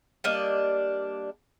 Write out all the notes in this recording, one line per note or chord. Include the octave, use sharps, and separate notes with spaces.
G3 A#3 D4 D#5